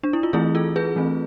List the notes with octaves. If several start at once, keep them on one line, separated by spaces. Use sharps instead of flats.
D4
E4
F4
E3 A3 C4 E4 G#4
F4 A4
G#4 B4
E3 A3 C4